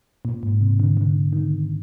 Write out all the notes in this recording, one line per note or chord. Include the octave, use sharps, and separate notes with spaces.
A#2
G#2
C3
D3
D3
D#3